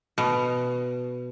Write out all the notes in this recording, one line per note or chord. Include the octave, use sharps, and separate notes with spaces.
B2